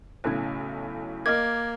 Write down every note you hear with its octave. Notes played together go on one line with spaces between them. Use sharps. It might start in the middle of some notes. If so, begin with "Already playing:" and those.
B1 A2 C#3 F#6 G#6
A#3 A#4 D#5 D6 F6 G#6